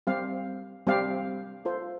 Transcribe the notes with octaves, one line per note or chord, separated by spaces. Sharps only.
G3 C4 G4 F5
G3 C4 G4 F5
F4 A4 C5